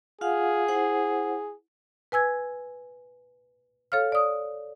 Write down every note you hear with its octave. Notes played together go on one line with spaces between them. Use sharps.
F4 G#4 F5 F#5
E4 C5 F#5
B4 G#5 E6 G#6
A4 C#5 F5 F6
D5 D#6